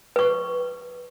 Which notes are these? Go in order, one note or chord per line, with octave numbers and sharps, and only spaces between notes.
B4 C#6